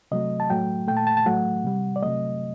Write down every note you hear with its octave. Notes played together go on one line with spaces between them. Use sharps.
C3 F#3 A3 D#5
A5
A2 F#3 A3 G5
A#2 A3 G5
A5
A5
A5
A2 F#3 A3 F#5
C3 G3
D5
C3 F#3 A3 D#5